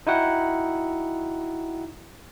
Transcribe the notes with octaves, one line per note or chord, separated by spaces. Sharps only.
D#4 E4 F#4 F#5 G5